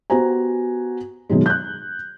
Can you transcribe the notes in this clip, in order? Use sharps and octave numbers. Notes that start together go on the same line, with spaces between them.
B3 F#4 G4 C5 G#5 A#5
F#2 B2 D#3 F#3 G#3
F#6 G6